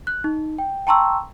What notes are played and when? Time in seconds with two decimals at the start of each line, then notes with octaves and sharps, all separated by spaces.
0.07 F#6
0.24 D#4
0.58 G5
0.87 G5 A5 A#5 C6 C#6 E6